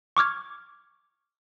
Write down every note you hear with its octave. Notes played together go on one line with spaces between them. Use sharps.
C#6 D6 F6 G#6